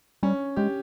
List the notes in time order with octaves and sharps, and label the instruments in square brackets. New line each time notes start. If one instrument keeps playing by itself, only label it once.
[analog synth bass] G3 [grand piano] C#4
[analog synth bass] G#3 [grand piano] G4